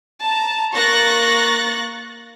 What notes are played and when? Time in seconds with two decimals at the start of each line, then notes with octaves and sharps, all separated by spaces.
0.22 A5 A#5
0.74 A#3 C#6 F#6 A6 A#6